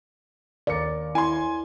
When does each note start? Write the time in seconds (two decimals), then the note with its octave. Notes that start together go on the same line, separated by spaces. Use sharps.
0.67 D#2 A#4 D5 C#7
1.15 E4 G#5 C6